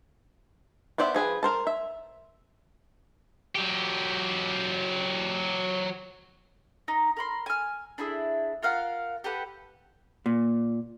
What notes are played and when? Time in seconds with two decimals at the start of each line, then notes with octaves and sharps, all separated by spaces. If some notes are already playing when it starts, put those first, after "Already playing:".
0.98 B3 G4 C5 D5 E5
1.14 F3 G#4 B4 G5
1.43 A#4 C5 A5
1.67 E5
3.56 F#3 G4
6.88 D#4 D#5
7.17 A#4 B5 C6
7.46 G#5 F6
7.98 D4 E4 G#4
8.62 F4 A#4 F5 F#5
9.24 G4 A4 B4 F#5
10.26 A#2